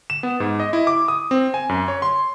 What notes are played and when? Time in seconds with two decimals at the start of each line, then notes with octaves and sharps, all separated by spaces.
0.10 E7
0.23 B3
0.40 G#2
0.60 D#5
0.73 E4
0.87 D6
1.08 D#6
1.31 C4
1.54 G#5
1.69 F#2
1.88 C#5
2.02 C6